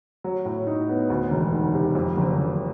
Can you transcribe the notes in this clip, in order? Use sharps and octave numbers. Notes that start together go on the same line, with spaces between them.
F#3
A2
D#4
B3
D2
E1
D#3
C3
F2
F#1
F#1